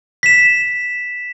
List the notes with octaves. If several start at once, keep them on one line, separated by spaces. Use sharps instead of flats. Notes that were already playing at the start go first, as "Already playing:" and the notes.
B6 E7